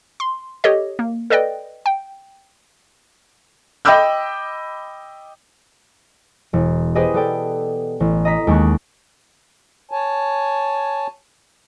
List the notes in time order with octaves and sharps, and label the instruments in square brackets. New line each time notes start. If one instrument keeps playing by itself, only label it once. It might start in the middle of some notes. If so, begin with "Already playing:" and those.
[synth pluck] C6
G4 A4 C#5 D#5
A#3
A4 B4 D5 D#5 G5
G5
[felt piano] D#5 G5 B5 D6 E6 G6
[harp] E1
G4 G#4 B4 C5 D#5
B3 A4 D5 G5
A1
D#5 A#5 B6
D#2 G#3 C#4 C#6 F#6
[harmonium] C#5 G#5 A5